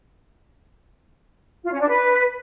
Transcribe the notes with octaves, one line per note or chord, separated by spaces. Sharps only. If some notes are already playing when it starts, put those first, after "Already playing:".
F4
C#4
D4
B4